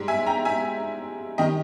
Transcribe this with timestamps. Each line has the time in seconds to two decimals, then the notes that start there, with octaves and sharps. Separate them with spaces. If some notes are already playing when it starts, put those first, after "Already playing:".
Already playing: G#2 G3
0.08 E5 G#5
0.26 G5 A#5
0.45 E5 G#5
1.38 D#3 G3 D#5 G5